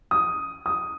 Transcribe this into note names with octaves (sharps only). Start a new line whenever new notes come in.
D#6
D#6